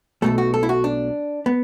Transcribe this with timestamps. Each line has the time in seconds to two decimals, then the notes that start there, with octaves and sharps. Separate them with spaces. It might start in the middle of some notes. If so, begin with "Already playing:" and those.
0.22 B1 B2 A3 A4
0.38 F#4
0.54 A4
0.63 E4
0.69 F#4
0.84 D4
1.46 B3